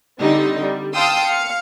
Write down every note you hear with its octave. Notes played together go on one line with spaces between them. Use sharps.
D3 G3 C4 D#4
G3
F5 G5 A5 C6 D#6 E6
F5 C#7